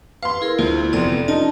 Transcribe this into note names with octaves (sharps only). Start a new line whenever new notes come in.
B4 F5 C6
E4 G#4 A#4
D2 E4 F4 C5
F1 E2 D5 C6
D#4 F4 D5 A5